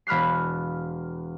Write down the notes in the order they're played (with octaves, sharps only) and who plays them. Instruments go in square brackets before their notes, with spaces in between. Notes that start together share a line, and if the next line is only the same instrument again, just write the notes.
[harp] E1 B5 F6 F#6 C7